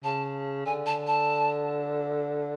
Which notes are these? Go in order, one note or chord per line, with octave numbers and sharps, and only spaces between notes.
C#3 A5
D3 G#5
A5
A5